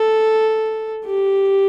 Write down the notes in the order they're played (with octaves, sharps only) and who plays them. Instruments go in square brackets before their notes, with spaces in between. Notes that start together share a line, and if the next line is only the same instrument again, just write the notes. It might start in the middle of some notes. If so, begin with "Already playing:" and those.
Already playing: [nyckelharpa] A4
G4